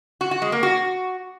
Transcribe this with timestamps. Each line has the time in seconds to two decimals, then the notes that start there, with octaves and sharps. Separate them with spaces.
0.21 F#4
0.31 F#4
0.42 G#3
0.52 A#3
0.63 F#4